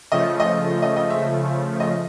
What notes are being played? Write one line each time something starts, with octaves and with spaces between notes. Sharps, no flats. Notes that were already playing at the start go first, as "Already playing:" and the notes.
C#3 F3 A3 D#5
D#5
D#5
D#5
E5
D#5